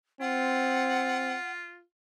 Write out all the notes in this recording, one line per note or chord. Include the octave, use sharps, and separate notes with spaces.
C4 F4 F#5